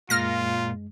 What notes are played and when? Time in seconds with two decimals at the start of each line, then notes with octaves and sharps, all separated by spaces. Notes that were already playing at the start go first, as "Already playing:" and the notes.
0.10 F#2 A#2 G#3 F4 F6 A#6